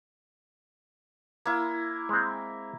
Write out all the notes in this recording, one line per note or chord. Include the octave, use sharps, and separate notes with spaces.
A#3 E4
G#3 C4